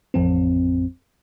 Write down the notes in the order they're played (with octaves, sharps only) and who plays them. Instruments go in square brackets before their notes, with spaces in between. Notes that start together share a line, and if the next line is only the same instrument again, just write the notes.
[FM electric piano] A1 F2 C4